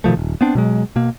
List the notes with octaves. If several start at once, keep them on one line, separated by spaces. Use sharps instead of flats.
B2 D#3 F3 A3
D#1
B3 C4 D4
B2 F#3 G#3
B2 A#3